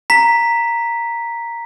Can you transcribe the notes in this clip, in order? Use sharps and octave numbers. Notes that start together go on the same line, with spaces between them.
A#5 B6